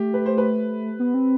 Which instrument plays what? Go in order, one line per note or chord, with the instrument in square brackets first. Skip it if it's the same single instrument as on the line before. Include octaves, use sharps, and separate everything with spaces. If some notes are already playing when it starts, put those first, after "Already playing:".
Already playing: [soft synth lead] A3 [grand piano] G4
[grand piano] B4
C5
B4
[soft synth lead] B3
C4